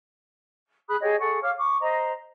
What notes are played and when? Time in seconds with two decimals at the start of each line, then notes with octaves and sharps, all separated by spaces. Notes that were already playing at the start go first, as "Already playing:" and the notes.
0.89 G#4 B5 D#6 F#6
1.02 G4 G#4 C#5 D#5
1.20 G#4 A4 F#5 C#6
1.42 C#5 F5 D6 F6
1.58 C#6 D6
1.81 C5 D#5 A#5